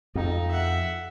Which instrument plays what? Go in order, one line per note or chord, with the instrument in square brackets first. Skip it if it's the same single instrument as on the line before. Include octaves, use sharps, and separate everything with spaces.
[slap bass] F2 [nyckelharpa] D#4
[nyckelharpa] E5 F#5